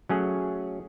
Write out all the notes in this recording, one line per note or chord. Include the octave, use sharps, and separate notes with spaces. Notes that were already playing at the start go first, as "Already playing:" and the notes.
F#3 A3 C#4 G#4